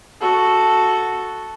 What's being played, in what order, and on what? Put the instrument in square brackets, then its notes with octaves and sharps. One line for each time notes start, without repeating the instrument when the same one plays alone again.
[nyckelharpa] F#4 A4